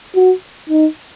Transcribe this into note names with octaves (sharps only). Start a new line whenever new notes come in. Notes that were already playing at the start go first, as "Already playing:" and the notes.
F#4
D#4